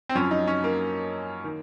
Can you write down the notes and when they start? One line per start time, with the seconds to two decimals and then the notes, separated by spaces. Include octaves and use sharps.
0.09 C4
0.15 F#2 F3 C#4
0.31 D#4
0.47 C#4
0.64 A#3
1.44 D#3